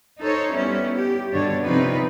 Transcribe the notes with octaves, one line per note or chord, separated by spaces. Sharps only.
D#4 A4 C5 C#5
G3 B3 C#4 E4
G4
G2 B2 D3 D4 C#5
C3 F3 C4 D#4 F4 B4